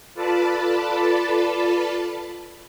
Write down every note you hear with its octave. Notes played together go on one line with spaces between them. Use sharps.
F4 A4 B4 D5 A5 B5